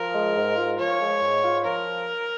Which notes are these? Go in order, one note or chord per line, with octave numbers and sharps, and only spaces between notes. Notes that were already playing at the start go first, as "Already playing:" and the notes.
Already playing: F3 A#4
G#3
G#2
F4
F3 C#5
G#3
G#2
F4
F3 A#4